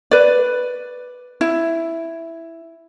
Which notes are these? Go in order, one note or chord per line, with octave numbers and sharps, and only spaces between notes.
B4 D5
E4